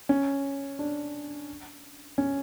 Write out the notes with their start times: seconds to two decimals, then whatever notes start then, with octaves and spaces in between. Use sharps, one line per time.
0.09 C#4
0.79 D4
2.18 C#4